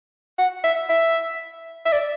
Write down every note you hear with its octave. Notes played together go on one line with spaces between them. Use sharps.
F#5
E5
E5
E5
D5